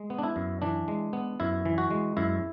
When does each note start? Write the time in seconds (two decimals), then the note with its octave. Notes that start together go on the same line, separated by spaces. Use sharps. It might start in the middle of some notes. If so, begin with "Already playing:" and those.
Already playing: G#3
0.10 B3
0.18 D4
0.23 E4
0.36 F#2
0.62 E3 D4
0.88 G#3
1.13 B3
1.40 F#2 E4
1.65 E3
1.78 F#4
1.90 G#3
2.17 F#2 E4